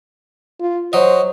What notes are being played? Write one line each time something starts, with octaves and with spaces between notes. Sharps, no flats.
F4
F#3 C5 D#5